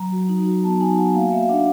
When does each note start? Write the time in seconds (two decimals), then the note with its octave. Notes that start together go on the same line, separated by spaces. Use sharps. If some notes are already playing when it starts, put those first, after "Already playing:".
Already playing: F#3 A#5
0.12 F#4
0.29 D#4
0.46 F#4
0.64 B3 A5
0.80 D#4 G#5
0.98 F#4 F#5
1.14 A#3 F5
1.32 A#3 E5
1.43 F5
1.49 D4 F#5